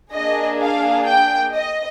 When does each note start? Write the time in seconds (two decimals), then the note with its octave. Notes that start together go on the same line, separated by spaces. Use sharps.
0.14 A#3 D4 G#4 D#5
0.60 F5
1.07 G5
1.53 D#5